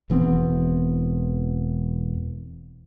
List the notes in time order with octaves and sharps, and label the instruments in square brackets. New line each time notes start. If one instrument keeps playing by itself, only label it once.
[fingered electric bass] E1 E3 B3 C4